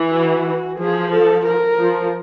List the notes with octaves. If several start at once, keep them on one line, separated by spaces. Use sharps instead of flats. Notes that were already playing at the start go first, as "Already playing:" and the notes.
Already playing: E3
F#4
F3 G#4
A4
A#4
F3